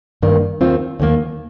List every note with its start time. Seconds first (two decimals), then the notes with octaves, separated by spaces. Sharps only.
0.22 G2 D#3 A#3
0.61 D#2 D#3 C4 F4
1.00 D#2 D#3 A#3